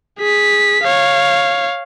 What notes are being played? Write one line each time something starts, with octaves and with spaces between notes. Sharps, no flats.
G#4 B6
C#5 F5